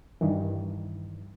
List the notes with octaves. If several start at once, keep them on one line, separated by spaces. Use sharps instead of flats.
G2 D#3 E3